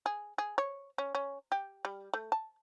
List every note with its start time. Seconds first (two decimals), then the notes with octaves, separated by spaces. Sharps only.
0.06 G#4
0.38 G#4
0.58 C#5
0.98 C#4
1.15 C#4
1.52 G4
1.85 G3
2.14 A3
2.32 A5